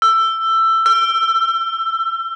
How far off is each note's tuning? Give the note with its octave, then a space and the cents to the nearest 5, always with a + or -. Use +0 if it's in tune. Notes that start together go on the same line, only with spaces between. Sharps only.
E6 +15
E6 +35